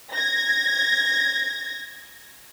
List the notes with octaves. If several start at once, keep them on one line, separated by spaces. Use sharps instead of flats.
G#6 A#6